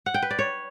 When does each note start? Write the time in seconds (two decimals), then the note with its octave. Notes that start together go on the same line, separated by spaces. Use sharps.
0.06 F#5
0.14 G5
0.22 B4
0.31 D5
0.39 C#5